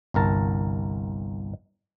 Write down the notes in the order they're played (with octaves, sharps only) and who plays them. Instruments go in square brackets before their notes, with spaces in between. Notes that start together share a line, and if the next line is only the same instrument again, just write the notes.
[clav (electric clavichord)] G1 C2 A#4 A5